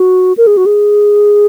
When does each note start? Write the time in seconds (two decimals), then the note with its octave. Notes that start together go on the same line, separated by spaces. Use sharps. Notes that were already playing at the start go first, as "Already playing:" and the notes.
Already playing: F#4
0.37 A#4
0.47 G#4
0.57 F#4
0.66 G#4